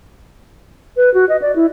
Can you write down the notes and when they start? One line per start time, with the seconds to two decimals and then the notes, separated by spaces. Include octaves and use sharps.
0.97 B4
1.14 F#4
1.29 D#5
1.42 D5
1.56 E4